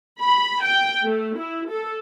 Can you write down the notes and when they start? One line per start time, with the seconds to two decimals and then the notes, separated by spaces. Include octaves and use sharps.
0.21 B5
0.63 G5
1.05 A3
1.38 E4
1.70 A4